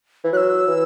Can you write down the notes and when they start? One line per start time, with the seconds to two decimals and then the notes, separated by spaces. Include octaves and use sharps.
0.24 E3
0.33 F#3 F#6
0.37 E6
0.68 E3